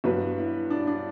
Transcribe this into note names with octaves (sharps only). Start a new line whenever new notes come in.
G2 F#3 B3 B4
E4
D4
D4